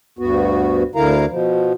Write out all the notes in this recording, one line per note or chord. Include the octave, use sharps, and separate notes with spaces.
D2 G2 B3 F#4
D2 D3 E4 A#4 F5 A#5
B2 F3